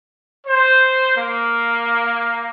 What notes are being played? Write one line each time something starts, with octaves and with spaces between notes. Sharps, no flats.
C5
A#3